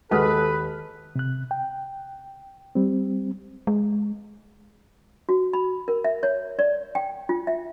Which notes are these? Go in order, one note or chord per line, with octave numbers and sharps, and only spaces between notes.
D#2 G#3 F#4 A4 B4 D#6 F6
C3 F#6
G5
G3 C4
G#3
F#4
B5
A#4
E5
C#5
D5
G5
F4
E5